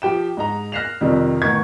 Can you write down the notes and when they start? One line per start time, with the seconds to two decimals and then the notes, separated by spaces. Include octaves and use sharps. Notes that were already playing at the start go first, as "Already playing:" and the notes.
0.02 F3 G4 G5 E7
0.37 G#2 D#4 A#5
0.72 F6 F#6 A#6 C7 E7 F7
1.01 F2 C3 D#3 F3 G3
1.42 A1 D#3 B3 A#4 C#6 G#6